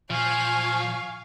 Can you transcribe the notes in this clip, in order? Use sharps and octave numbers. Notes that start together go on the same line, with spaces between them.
A#2 F3 F5 G#5 C#6